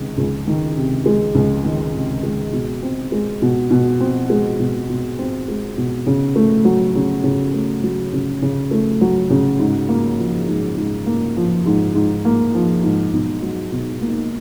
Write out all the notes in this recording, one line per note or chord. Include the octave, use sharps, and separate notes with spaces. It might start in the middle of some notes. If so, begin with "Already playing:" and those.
Already playing: C#2 C3 D#3 G#3
C#2
D#3
C3
G#3
C#2
D#3
C3
G#3
B2
C4
G#3
B2
B2
C4
G#3
B2
B2
C4
G#3
B2
C#3
A3
F#3
C#3
C#3
A3
F#3
C#3
C#3
A3
F#3
C#3
G#2
A#3
F3
G#2
G#2
A#3
F3
G#2
G#2
A#3
F3
G#2
B1
F#3
B2
A#3